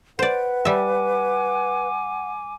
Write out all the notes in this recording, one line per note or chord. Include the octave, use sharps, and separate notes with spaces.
B4 C5 D5 F#5
G3 E5 G#5 D6